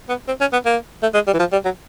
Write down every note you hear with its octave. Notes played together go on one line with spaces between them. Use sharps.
B3
C4
C#4
B3
A#3
A3
G#3
G3
E3
F3
G3
F#3